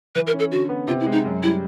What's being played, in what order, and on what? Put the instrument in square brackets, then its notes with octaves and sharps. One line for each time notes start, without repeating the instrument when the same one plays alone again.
[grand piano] E3 [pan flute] B4
[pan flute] A#4
[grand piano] C#4
[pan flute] A4
[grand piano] D3 [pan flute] F#4
[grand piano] B3
[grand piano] C3 [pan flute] F4
[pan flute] E4
[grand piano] G#3
[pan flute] D#4
[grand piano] F#2
[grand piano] G3 [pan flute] E4